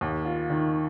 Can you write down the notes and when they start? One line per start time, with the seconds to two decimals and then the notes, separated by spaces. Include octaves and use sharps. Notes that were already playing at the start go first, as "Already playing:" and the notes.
0.01 D#2
0.25 F4
0.50 D#3